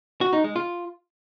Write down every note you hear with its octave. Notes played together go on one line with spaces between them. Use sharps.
F#4
D#4
G#3
F4